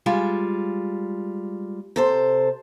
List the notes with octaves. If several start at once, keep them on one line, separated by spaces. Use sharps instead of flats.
G3 G#3 F4
C3 A4 C5